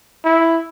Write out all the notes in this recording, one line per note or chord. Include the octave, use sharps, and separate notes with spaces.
E4